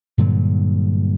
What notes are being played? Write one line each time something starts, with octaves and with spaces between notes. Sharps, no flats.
G2 A#2 D3 F#3